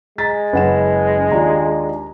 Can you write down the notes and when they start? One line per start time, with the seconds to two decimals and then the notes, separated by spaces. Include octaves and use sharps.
0.18 G#3 A#5 A6 B6
0.53 F#1 C#4 B4 F#5 E7
1.32 D#2 D4 F4 A#5